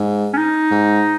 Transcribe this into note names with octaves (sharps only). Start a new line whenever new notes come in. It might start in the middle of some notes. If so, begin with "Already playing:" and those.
Already playing: G#2
C#4
D#4
G#2